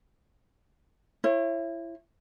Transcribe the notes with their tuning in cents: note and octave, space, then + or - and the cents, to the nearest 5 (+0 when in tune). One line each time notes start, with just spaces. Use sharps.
E4 +25 C#5 -30